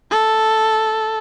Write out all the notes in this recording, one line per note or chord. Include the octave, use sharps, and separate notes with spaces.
A4